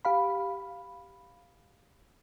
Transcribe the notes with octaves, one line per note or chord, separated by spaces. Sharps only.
G4 F5 B5